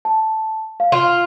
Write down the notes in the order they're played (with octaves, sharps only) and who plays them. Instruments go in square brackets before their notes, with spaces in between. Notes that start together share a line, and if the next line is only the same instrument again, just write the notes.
[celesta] A5
F5
[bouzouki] F4